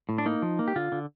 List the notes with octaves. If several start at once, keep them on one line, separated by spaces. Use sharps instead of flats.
A2
D4
A#3 D#4
F3
A#3
G4
D3 F4
D3